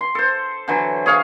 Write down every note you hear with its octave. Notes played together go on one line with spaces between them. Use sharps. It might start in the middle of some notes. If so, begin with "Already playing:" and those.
C6
A4 C5
D3 E3 F#3
G#4 C#5 F5